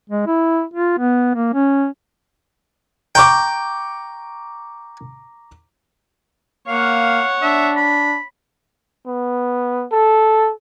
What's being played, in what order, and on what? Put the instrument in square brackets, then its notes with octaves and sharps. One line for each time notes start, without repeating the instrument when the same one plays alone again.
[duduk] G#3
E4
F4
B3
A#3
C#4
[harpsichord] G5 [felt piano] A#5 C#6 D6
[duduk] A#3 [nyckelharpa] C#5 F#5 [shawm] F5
[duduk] D4 [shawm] E5
[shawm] B5
[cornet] B3
A4